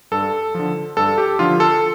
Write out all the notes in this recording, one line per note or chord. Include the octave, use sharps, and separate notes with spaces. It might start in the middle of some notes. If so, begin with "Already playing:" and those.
G2 A4
D3 F3
G2 A4
G4
D3 F3 F4
A4